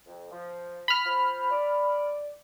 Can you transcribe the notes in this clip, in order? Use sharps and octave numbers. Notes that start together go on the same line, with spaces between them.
F2
F3
B5 F6
F4 C5
D5